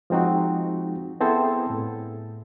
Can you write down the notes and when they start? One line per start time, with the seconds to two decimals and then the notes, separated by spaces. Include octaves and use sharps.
0.10 F3 G#3 C4 D#4 F#4
1.20 B3 C4 E4 G#4 A4 C5
1.70 A2